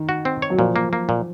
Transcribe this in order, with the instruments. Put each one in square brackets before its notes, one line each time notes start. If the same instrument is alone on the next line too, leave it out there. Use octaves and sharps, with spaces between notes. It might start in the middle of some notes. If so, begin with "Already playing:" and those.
Already playing: [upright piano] D#3
[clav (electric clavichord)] F#4
C4
C#5
[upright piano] F#3
[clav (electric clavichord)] A#2 [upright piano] F3
[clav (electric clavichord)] A#3
A#3
A#2